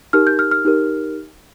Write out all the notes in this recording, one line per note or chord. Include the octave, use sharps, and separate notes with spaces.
D#4 G4 A#4 F6
G6
F6
F6
D#4 G4 A#4